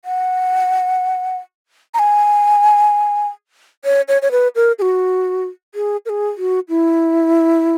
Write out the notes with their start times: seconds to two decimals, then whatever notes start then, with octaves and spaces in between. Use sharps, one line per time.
0.05 F#5
1.94 A#5
1.99 G#5
3.85 C#5
4.08 C#5
4.22 C#5
4.31 B4
4.56 A#4
4.79 G#4
4.82 F#4
5.75 G#4
6.06 A#4
6.09 G#4
6.38 F#4
6.69 E4